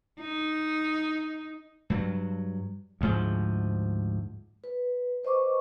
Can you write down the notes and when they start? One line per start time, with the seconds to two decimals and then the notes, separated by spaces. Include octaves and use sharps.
0.20 D#4
1.90 G2 F#3
3.01 D2 G#2 F3
4.64 B4
5.23 B4 C5 D#5 C#6 D6